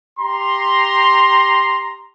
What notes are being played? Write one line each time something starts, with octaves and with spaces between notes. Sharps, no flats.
G4 A#5 C6